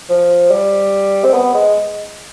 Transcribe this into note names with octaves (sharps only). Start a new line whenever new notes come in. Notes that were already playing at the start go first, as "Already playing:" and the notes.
F3
G3
C4
B3
G#3